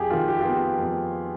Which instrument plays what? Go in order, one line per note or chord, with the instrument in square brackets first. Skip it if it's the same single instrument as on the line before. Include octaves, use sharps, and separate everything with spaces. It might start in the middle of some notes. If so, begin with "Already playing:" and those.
Already playing: [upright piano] F2 G4 G#4
D#3 F4
G4
B3 F4
G4
F2